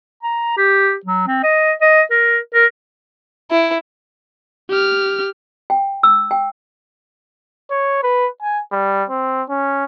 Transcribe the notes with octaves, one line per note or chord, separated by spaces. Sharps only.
A#5
G4
F#3
C4
D#5
D#5
A#4
A#4
E4
G4 F6
G5
E6
G5
C#5
B4
G#5
G3
C4
C#4